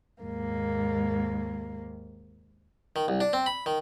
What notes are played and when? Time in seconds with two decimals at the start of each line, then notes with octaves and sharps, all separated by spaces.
0.23 D#2 G#2 A#3
2.96 D#3
3.08 C2
3.21 D4
3.33 C4
3.46 B5
3.66 D#3